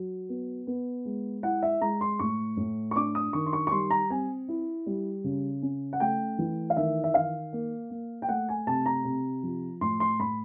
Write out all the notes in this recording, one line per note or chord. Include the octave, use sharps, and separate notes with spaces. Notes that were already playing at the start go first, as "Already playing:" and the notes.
Already playing: F#3
B3
B3
G#3
E4 F#5
E5
G#3 A#5
C6
A2 C#6
A2
C#6
D4 D6
D#6
D#3 C#6
C6
C#6
C#6
G3 C6
A#5
C4 G#5
E4
G3
C#3
C#4
F#5
A3 G5
E3
F5
D#3 E5
E5
D#3 F5
A#3
A#3
G5
A3 F#5
G#5
C3 A5
A#5
C3
F3
A2 C6
C6
A2 B5